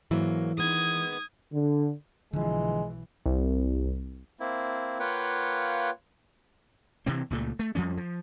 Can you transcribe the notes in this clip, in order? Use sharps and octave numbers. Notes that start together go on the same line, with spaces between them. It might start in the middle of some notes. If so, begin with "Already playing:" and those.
G#2 E3 F#3 A#3
D#3 G#3 B3 D#6 G#6
D3
B1 D3 E3 F3 G#3
C2
A#3 C4 E4
A#3 F4 B4 C#5 F#5 G5
C3 E3 C4
C#2 A#2 A3
A3
F2 F3 G3 C#4
F3